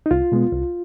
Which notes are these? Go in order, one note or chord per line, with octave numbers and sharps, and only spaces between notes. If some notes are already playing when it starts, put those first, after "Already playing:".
D#4
C2 F4
B2 G#3 B3
C2